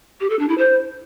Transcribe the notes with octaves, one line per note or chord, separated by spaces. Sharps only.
G4
A4
D4
E4
C5